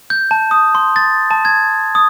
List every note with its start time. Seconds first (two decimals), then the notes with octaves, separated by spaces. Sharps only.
0.10 G6
0.31 A5
0.51 D#6
0.75 C6
0.96 A6
1.31 A5
1.45 G#6
1.95 D#6